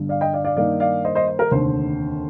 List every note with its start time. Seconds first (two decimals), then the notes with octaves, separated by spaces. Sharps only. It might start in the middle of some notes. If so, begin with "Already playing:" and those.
Already playing: G1 G2 D3
0.09 D5 F5
0.21 D#5 G5
0.33 D5 F5
0.45 D5 F5
0.57 G2 D#3 A#3 D#4 D5 F5
0.80 D5 F5
1.05 C5 D#5
1.15 C5 D#5
1.28 C5
1.39 A#4
1.51 F1 D#2 D3 C5